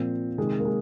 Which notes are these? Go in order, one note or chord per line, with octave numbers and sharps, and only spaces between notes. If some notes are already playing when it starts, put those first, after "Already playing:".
Already playing: A#2 F3 C4
C3 D#3 G#3
A#3
G#3